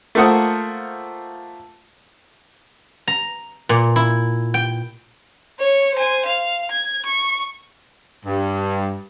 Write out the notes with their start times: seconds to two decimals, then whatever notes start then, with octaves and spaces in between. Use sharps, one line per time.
0.15 A3 A#3 F4 C5 F#5 D#6
3.08 A#5
3.69 A#2
3.96 E4
4.54 G5
5.59 C#5 C#7
5.94 C5 G#5
6.25 F5
6.71 G#6
7.06 C#6
8.26 G2